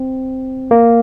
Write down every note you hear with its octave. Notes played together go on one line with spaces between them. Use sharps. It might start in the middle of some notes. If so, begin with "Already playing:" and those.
Already playing: C4
A#3